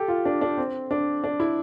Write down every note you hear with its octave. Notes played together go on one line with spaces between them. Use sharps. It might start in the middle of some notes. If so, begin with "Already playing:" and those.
Already playing: G4 A4
F4
D4
D4
C4
D4
D4
E4